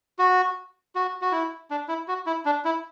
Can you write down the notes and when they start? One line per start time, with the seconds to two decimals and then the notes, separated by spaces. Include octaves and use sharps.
0.19 F#4
0.95 F#4
1.22 F#4
1.32 E4
1.71 D4
1.88 E4
2.08 F#4
2.26 E4
2.45 D4
2.65 E4